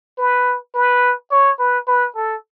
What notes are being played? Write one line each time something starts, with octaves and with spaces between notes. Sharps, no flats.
B4
B4
C#5
B4
B4
A4